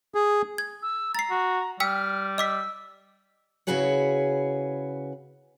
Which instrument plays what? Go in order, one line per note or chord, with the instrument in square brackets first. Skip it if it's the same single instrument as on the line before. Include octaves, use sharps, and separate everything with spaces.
[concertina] G#4
[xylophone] G#6
[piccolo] E6
[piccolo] A#5 [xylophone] A6 C7
[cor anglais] F#4
[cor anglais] G3 [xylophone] G5 E6 B6 [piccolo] F6
[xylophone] D#5 D6 B6 [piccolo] E6
[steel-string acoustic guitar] C#3 E4 F#4 G#4 B4 C#5